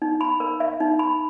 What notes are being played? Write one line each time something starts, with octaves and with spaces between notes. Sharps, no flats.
D#4
B5
A#4
E5
D#4
B5